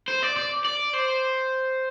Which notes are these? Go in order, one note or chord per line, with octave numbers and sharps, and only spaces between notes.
C5
D5
D5
D5
C5